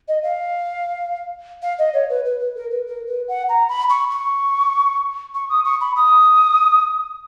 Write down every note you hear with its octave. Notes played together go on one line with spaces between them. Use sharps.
D#5
F5
F5
D#5
C#5
B4
B4
B4
A#4
B4
A#4
B4
F#5
A#5
B5
C#6
C#6
C#6
D#6
C#6
B5
D#6